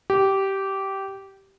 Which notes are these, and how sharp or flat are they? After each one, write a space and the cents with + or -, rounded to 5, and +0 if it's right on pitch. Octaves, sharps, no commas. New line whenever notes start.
G4 -15